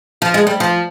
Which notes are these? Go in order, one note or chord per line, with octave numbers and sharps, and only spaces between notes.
F3
G#3
G3
F3